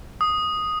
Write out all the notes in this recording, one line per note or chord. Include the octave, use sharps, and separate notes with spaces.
D#6